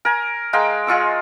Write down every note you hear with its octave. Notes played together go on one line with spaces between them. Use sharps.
A#4 G#5
G#3 A#4 F5 G5
G#3 F4 C#6 E6